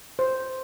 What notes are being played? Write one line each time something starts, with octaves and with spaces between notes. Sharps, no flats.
C5